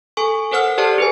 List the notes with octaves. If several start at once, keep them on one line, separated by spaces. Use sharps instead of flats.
A4 G#5 C#6
A4 A#4 C5 F#5 F6
G4 A4 C5 D5 A5
G#4 B4 G#5